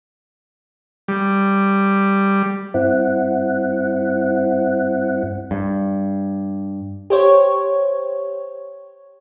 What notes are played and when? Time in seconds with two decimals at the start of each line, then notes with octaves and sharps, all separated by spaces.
1.08 G3
2.74 G2 C4 E4 F#5
5.51 G2
7.10 G4 C5 C#5